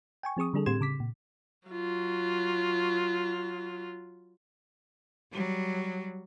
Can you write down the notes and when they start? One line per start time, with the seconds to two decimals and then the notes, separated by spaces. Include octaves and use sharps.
0.23 G5 G#5 C#6
0.37 F3 C4 G#4 C#6 D#6
0.54 D3 G3 D4 G#4 A4
0.66 A2 C4 G4 C6 G#6 E7
0.81 C#3 D6 B6
1.00 A#2
1.68 F#3 F4
5.32 F#3 G3